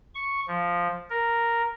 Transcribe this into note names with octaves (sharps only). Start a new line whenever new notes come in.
C#6
F3
A#4